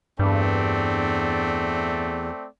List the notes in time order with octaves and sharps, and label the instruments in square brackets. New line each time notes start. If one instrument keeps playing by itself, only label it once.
[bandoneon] E2 [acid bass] G2 [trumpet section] A3 C4 D5